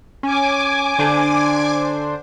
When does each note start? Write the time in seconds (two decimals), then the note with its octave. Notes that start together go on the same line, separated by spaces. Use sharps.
0.23 C#4 G#5 D6
0.99 D3 D4 C5